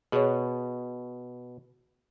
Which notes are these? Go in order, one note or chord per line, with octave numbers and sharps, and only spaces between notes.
B2 G#4 C#5